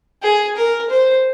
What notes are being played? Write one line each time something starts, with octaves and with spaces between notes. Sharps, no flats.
G#4
A#4
C5